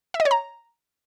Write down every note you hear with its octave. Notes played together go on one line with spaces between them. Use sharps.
E5
D#5
C#5
A#5